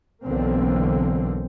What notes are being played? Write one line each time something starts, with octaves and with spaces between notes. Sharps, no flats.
B1 D3 E3 A#3 C4